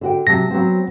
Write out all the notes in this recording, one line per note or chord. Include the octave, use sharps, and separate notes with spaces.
D3 F#4 G5
C3 F#3 A5 A#6
F#3 B3 C4